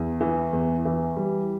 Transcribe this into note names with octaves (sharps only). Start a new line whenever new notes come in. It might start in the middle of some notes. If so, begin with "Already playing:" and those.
Already playing: E2
E3
E2
E3
G3